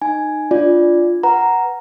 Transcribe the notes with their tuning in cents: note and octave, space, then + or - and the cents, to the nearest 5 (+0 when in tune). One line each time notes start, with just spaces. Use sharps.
D#4 -20 G#5 +5
D4 +0 F4 +0 D5 -5
B4 +0 F#5 +10 A#5 +0